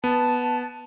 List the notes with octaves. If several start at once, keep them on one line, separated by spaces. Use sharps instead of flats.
B3 A5